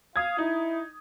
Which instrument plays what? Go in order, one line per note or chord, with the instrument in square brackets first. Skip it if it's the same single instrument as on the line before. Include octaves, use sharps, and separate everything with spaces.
[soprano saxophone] F5 [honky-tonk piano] D#6 G#6
[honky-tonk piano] D#4 [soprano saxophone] E4